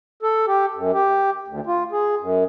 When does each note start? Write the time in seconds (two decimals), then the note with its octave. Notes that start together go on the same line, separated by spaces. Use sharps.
0.23 A4
0.47 G4
0.75 F#2
0.93 G4
1.47 D2
1.67 F4
1.92 G#4
2.20 F#2